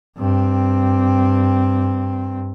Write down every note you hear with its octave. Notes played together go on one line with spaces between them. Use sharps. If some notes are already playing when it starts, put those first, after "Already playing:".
G2 C4